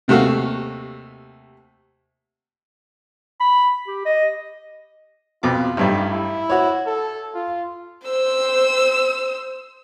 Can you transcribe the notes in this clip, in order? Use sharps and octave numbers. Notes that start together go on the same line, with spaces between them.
D#2 C3 A3 F#4 F5
B5
G4
D#5
F2 B2 F4 D6
A1 G2 G3 D#4
E4
F#4 C#5
A4
F4
C5 E6